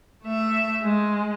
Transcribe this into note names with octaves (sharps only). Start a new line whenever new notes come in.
A3 E5
G#3